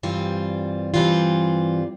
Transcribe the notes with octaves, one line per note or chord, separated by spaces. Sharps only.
G2 E3 G3 C4 F4
G2 E3 G3 C4 F4